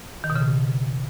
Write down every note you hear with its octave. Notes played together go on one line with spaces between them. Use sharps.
D#3
B2
C#3